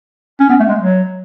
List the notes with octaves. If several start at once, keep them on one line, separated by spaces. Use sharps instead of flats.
C#4
B3
A3
G#3
F#3